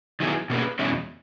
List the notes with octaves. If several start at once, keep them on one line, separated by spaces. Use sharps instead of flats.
D#3 F#3 B3 E4 G#4
B2 A#3 C#4 G#4 B4
E2 B2 G#3 C#4 E4